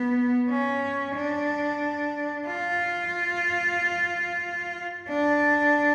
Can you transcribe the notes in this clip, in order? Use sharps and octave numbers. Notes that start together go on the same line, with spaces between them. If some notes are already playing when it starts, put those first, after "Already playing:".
Already playing: B3
C#4
D4
F4
D4